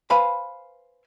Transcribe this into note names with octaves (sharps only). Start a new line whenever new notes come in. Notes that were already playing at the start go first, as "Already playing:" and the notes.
B4 C5 F5 G#5 B5